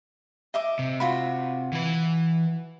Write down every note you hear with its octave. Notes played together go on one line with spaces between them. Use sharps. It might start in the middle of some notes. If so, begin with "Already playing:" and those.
D#5 E5 D6
C3
F4 F#4 B5
E3 B4